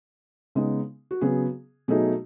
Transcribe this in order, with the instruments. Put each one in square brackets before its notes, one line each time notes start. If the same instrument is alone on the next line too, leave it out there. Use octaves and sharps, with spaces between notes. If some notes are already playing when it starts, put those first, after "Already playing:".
[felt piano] C#3 G#3 B3 D#4
F#4
C#3 F#3 B3 G#4
B2 F#3 A3 D#4 G#4